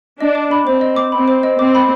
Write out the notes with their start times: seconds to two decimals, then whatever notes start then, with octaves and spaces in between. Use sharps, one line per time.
0.20 D4 D#5
0.35 D6
0.51 B5
0.66 C4 C5
0.81 D#5
0.96 D6
1.12 C4 B5
1.28 C5
1.43 D#5
1.58 C4 D6
1.75 B5